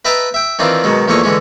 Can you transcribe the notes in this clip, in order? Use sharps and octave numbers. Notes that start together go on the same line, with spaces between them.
B4 D#5 E5 G5 A5 A#5
E5 G5
D#3 E3 C4 D4 E4 F4
B2 D#3 F#3 G#3
E2 A#2 F3 A3 C#5 D#5
D3 E3 G#3 C#4